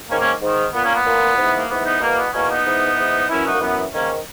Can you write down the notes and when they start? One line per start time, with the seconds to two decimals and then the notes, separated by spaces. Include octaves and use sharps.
0.09 G#2 D#3 A#3 C#4
0.19 A#3 C#4
0.41 G#2 D#3
0.73 A#2 B3
0.83 A#3 C#4
0.94 B3
1.05 A#2
1.37 G#2 E3
1.56 A#3
1.69 G#2 E3 B3
1.84 B3 D#4
2.01 E2 B2 A#3
2.17 B3
2.32 E2 B2 A#3 C#4
2.49 B3 D#4
2.65 G#2 E3
2.97 G#2 E3
3.28 F#2 E3 C#4 E4
3.45 D#4 F#4
3.54 A#3
3.61 F#2 E3 B3
3.93 G#2 D#3 A#3 C#4